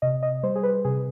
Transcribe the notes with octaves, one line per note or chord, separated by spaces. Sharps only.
C3 D#5
D#5
G3 C5
G#4
B4
C3 G#4